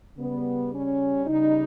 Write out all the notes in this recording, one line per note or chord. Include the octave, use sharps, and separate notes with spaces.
C#3 G3 B3
C#4
C#3 G3 D#4